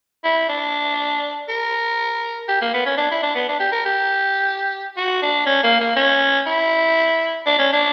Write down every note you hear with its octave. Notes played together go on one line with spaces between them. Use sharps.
E4
D4
A#4
G4
A#3
B3
C#4
D4
E4
D4
B3
D4
G4
A#4
G4
F#4
D4
C#4
A#3
A#3
C#4
E4
D4
C#4
D4